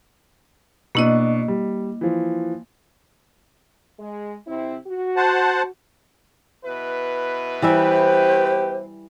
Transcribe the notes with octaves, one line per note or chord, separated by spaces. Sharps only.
B2 A#3 D4 E4 D#5
G3
E3 F3
G#3
C3 C4 E4
F#4
C5 F#5 A5
B2 E4 B4
E3 G3 G4 C5 E5